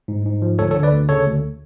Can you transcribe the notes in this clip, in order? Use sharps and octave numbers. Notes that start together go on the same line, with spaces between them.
G#2
G#2
F3
D2 A4 C#5
A4 C#5
D3
B4 D5
D2
C#3 A4 C#5
D2